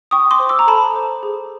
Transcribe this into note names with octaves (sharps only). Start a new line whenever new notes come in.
G5 C#6 D#6
C6 D6
C5
D6 E6
A#5
A4 A5 B5
C5
G#4